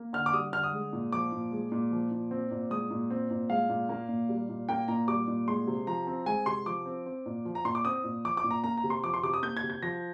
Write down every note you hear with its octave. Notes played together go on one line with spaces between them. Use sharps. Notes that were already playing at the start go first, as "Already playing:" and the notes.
Already playing: A#3
D3 F6
D6
G3 D#6
D3 F6
D#6
G#3
A#2
F3 D6
A#2
G#3
A#2
F3
A#2
C4
A#2
G#3 D#6
A#2
C4
A#2
G#3 F5
A#2
A#3
A#2
G3
A#2
A#3 G5
A#2 A#5
G3 D6
A#2
G#3 C6
C3
F3 A#5
C4
G#3 G#5
C3 C6
F3 D6
C4
C4
A#2
F3
A#5
A#2 C6
D6
C4 D#6
A#2
F3 D6
D6
A#2
A#5
A#3 A#5
A#5
C3
C6
F3 D6
C6
C3 D6
D#6
A#3 G6
G#6
C3
G#6
F3 A#6